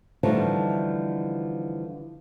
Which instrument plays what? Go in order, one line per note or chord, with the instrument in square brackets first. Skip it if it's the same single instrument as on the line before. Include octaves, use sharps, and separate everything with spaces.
[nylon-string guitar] D3 E3 F3 G3 A3 D#4